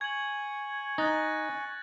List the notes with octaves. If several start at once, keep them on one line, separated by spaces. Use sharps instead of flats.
G#5 C#6 G#6 F#7
D#4 F#6 A6 A#6